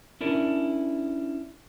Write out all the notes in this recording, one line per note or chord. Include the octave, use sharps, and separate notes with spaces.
C#4 D4 E4 A#4